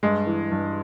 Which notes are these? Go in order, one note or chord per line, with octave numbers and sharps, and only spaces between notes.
G2 G#3
E3
G2